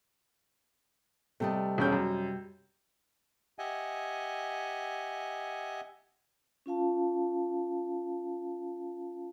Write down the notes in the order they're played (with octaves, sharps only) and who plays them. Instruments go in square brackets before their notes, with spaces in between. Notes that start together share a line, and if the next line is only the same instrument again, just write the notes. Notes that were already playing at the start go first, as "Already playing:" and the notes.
[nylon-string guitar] C3 G3 D#5 [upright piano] A3
[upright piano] E1 C#4 G6
F#2
[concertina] G4 D#5 E5 F#5 G#5
[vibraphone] C#4 F4 F5 A5